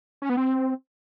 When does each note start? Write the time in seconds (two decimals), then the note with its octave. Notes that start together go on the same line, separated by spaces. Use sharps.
0.22 C#4
0.29 B3
0.37 C4